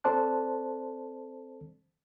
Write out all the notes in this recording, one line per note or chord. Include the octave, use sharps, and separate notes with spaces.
C4 A4 C5 D5 A5 F#6